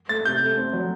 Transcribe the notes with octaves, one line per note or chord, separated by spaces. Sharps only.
A3 A6
C3 G6
A3
C4
F#3